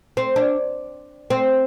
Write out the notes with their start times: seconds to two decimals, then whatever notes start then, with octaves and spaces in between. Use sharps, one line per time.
0.17 C4
0.36 D4
1.30 C4